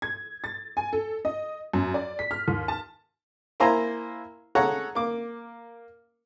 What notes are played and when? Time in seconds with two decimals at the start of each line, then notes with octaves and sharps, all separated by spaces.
0.02 G#6
0.44 A6
0.77 G#5
0.93 A4
1.25 D#5
1.73 F#2
1.94 D5
2.19 B6
2.31 F6
2.48 D#2
2.68 A5
3.60 A#3 E4 C5 G#5 A#5
4.55 G#4 A4 C#5 F#5 A#5
4.95 A#3 D6